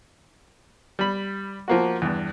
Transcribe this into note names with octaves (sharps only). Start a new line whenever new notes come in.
G3 B5
F3 A#3 F#4
E2 G2